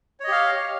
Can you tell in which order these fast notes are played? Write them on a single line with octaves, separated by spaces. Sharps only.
C#5 D#5 G4 F5